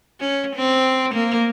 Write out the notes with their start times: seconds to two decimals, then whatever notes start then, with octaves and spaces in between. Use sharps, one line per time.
0.20 C#4
0.56 C4
1.14 A#3